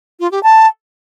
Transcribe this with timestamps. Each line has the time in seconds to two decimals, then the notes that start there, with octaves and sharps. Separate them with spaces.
0.20 F4
0.32 G4
0.43 A5